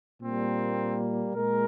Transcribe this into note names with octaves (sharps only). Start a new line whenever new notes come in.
A#2 G3 A#3 C4
A#2 G#3 A#4